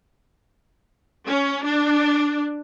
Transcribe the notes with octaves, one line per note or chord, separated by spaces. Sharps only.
C#4
D4